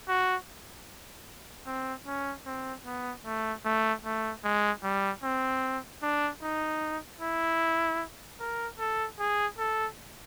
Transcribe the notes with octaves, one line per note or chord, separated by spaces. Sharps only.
F#4
C4
C#4
C4
B3
A3
A3
A3
G#3
G3
C4
D4
D#4
E4
A#4
A4
G#4
A4